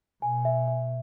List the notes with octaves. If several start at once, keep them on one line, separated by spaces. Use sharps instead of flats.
B2 G#5
E5
E5